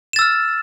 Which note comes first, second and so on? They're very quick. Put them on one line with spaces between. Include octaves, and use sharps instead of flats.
E7 A6 E6 F6